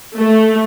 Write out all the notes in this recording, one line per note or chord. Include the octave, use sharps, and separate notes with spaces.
A3